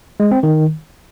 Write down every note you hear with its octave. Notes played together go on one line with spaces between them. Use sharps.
G#3
C4
D#3